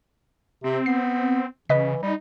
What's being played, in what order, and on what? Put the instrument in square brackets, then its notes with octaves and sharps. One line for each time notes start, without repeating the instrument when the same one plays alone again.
[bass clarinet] C3 [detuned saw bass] C4
[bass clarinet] B3 [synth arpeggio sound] C7
[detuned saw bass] C#3 [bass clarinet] E3 [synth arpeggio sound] B4 D#5 B6
[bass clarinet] G3 [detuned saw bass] D#4